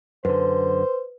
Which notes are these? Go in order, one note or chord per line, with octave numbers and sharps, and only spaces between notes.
F#2 D3 B4 C5